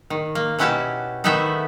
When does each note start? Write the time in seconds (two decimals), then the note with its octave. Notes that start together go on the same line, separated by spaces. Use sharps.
0.10 D#3
0.35 A#3
0.59 B2 C#4 E4 F#4 G4 A5
1.24 D#3 A3 B3 F#4 G4 E5